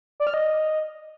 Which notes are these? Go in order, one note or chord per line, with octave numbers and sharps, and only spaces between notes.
D5
F6
D#5